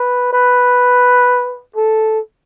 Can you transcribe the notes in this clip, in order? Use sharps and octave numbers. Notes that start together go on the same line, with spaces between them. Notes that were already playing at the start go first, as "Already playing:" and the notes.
Already playing: B4
B4
A4